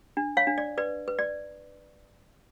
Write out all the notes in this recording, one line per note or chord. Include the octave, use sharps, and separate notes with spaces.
D4
C#5 F5
D4
D5
B4 D5
B4
D5